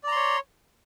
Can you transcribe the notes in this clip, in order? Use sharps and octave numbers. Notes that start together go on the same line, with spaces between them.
C#5 D5 A#5 C6